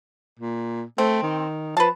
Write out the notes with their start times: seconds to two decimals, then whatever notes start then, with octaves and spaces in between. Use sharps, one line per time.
0.39 A#2
0.98 A3 C4
1.23 D#3
1.77 F3 B4 A5